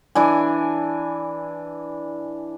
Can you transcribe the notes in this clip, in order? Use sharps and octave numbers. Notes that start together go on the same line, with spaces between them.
E3 D4 G#5